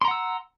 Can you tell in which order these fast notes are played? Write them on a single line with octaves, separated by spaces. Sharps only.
C6 A#5 F#5 E6